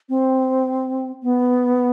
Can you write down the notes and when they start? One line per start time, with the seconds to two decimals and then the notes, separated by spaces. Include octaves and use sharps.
0.09 C4
1.23 B3